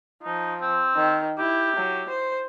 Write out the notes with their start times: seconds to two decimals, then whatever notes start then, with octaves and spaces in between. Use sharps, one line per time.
0.23 F3 D#4
0.61 C4
0.96 D#3
1.38 E4 G4
1.76 F#3
2.09 C5